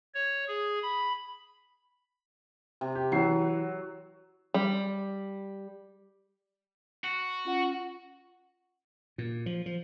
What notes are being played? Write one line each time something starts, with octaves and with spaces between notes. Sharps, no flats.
C#5
G#4
B5
C3
G4
E3 F#3 C7
G3
F#4
C#4 F4 F#5
A#2
F3
F3